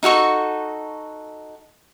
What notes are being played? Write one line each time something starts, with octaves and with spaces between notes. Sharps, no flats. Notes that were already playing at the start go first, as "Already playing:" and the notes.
D#4 F#4 A4 C#6